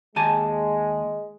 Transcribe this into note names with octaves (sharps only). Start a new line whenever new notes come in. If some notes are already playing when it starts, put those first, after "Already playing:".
D#2 G#3 G#5 A5